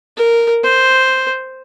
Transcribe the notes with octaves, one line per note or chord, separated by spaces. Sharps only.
A#4
C5